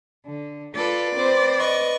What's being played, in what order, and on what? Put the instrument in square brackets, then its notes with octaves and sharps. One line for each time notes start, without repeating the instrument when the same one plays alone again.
[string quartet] D3
[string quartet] F4 A4 B4 [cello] D5
[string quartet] C4 B4 C5
B4 D#5 C#6